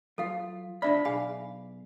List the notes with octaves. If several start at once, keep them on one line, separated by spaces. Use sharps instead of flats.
F#3 F4 A4 F5 F#5
C#2 D4 C5 D5 E5 B5
B1 G#4 F5 G#5 B5